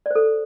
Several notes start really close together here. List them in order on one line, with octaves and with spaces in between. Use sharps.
D5 C5 A4